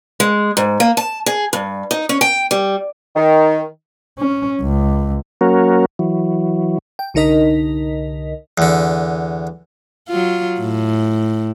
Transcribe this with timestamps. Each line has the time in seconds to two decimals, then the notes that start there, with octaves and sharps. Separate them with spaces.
0.20 G#3
0.57 G#2
0.80 A#3
0.97 A5
1.26 G#4
1.53 G2
1.91 D#4
2.09 C#4
2.21 G5
2.51 G3
3.15 D#3
4.19 C#4
4.61 C#2
5.41 F#3 A#3 C#4 F#4 A#4
5.99 E3 F#3
6.99 G5
7.14 C2 D3 D#4 A#4 D#5 B6
8.58 E2 D3
10.09 F#3 F4
10.59 A2